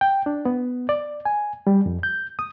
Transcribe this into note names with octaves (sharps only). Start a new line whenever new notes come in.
G5
D4
B3
D5
G#5
G3
F2
G6
D#6